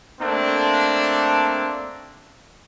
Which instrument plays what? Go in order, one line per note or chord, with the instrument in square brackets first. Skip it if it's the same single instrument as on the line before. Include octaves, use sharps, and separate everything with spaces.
[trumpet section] A3 A#3 C4 D4